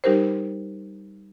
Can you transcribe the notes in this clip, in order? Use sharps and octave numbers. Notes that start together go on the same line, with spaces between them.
G3 D#4 G4 A#4 C5